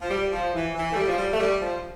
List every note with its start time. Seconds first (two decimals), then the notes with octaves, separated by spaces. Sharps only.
0.02 F3
0.10 G3
0.32 F3
0.54 E3
0.75 E3
0.92 A3
0.96 G3
1.08 F3
1.18 G3
1.32 A3
1.40 G3
1.61 F3